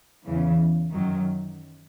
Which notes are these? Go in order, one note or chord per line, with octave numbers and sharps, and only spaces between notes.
E2 C#3 E3
F#2 D#3 F#3